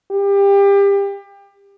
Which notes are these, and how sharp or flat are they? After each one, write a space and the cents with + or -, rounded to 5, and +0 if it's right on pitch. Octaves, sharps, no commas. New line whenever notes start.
G4 +25